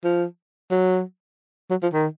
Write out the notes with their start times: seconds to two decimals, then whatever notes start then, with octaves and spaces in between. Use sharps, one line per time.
0.04 F3
0.71 F#3
1.70 F#3
1.83 F3
1.93 D#3